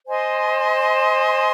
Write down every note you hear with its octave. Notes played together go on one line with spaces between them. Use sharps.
C5 D#5 G#5 C6